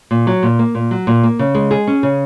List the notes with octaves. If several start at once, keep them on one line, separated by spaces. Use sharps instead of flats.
A#2
F#3
A#2
A#3
A#2
F#3
A#2
A#3
C#3
G#3
G#4
C#4
C#3